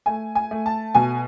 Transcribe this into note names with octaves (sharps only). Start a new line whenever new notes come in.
A3 G#5
G#5
A3
A5
B2 G#5